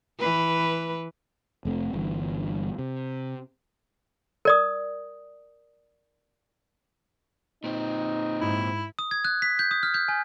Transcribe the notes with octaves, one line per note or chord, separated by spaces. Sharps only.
E3 B4
F1 A3 C4
G1 G2 E3
C3
A#4 D5 D#6
A#2 C4 D#4
G#2 E4
D#6
G#6
F#6
B6
G6
D#6
F6
G6
G#5